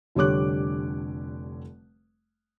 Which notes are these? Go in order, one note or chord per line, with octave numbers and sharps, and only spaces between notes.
F1 D3 G3 C#5 D6 F#6